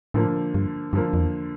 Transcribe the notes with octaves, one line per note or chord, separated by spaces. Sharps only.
A2 D3 F3 A#3
G2
G2 D3 F3 A#3
F2
E2